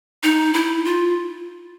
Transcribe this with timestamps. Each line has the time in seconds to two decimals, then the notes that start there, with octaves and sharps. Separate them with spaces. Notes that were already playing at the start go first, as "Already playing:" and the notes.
0.23 D#4
0.54 E4
0.85 F4